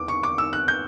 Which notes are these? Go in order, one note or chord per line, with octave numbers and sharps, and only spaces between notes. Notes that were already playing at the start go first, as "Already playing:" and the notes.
Already playing: E2 D6
C#6
D6
E6
F#6
G6